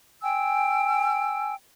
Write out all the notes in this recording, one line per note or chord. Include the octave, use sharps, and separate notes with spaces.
G5 G#5 E6